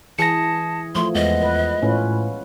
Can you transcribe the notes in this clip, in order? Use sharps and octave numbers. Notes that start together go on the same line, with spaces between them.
E3 G#4 A5 A#6 C#7
F3 A3 C6
E2 G#3 B3 D#5
B4
A2 C#4 F4 B4